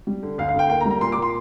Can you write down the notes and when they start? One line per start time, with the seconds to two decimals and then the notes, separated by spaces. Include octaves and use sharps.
0.07 G3
0.23 D3
0.38 D2 F5
0.49 F5
0.54 D2
0.59 G5
0.70 A#3 G5
0.81 A#5
0.85 G3
0.91 A#5
1.01 A#2 C6
1.12 D6
1.17 A#2
1.22 C6